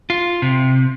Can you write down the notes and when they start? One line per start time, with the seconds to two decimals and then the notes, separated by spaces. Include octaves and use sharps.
0.10 F4
0.42 C3